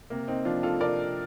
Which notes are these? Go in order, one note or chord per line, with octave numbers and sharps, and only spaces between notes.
C3 A#3
C4 D#4
F3 D4 F4
F4 A4
C3 A#4 D5